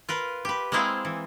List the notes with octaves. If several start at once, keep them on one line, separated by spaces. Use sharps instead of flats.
F4 A#4 B4
G4 B4
G#3 A#3 C4 E4 G#4 F5
E3